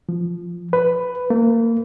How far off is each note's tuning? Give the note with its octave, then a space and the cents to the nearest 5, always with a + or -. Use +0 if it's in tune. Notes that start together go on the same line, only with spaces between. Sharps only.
F3 -5
B4 +10
A#3 -20